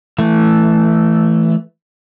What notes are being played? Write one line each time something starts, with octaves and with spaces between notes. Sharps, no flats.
E3 A3